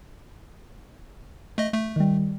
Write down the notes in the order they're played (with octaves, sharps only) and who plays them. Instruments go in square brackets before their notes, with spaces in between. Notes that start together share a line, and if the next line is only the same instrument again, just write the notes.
[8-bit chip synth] A3 D#5
A3
[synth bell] D#3 G3